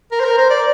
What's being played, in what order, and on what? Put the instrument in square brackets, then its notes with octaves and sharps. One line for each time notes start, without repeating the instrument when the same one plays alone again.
[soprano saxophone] A#4
C5
A#4
C5
D5